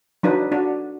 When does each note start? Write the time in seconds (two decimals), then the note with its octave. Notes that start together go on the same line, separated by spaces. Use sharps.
0.23 F#3 D4 D#4 B4
0.52 D4 F#4